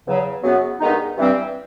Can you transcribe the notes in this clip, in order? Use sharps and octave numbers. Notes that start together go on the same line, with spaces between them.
E2 C#3 F#3
F#2 C#3 F#3 B3
G2 D#3 G#3 B3 D#4
G2 E3 G3 C4